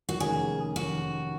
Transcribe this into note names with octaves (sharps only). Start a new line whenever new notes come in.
F#4
F1 D#2 D#3 A#3 C#4 G#4
F1 D#2 D#3 A#3 C#4 F#4